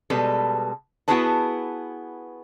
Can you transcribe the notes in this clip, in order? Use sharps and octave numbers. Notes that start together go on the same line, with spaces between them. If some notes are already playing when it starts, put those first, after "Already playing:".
B2 G3 G#3 A4 B4
B3 E4 F#4 G#4 B4 A5